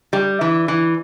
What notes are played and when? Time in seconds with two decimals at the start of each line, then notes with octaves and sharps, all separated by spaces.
0.13 G3
0.41 E3
0.68 E3